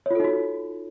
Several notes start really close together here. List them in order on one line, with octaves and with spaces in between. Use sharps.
C#5 F4 A4 D#4 F#4